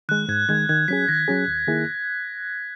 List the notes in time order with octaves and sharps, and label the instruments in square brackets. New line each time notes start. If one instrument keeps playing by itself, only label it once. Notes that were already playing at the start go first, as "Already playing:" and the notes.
[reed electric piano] D#3 G#3 [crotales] F#6
[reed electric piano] G#2 [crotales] G#6
[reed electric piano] D#3 G#3 [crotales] G#6
[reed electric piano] D#3 [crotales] G#6
[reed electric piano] F#3 C#4 G#4 [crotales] B6
[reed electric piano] D#3 [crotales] A#6
[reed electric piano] F#3 C#4 G#4
D#2
D#3 A#3 E4 G#4